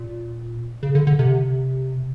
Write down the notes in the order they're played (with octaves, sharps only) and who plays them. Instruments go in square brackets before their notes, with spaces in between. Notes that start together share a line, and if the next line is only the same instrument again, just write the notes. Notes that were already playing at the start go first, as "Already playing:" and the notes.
Already playing: [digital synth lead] A#2
C#3
D3
D3
C3